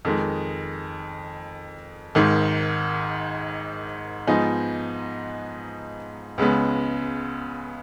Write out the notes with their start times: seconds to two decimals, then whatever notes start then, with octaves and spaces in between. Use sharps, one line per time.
0.05 F2 D#3 G#3
2.15 G#1 G#2 D#3
4.27 G#2 F3 B3 D#4 G#4
6.38 C#2 C#3 G#3 B3